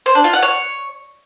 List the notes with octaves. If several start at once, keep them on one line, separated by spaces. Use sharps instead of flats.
C5
D4
F4
F#5
C#5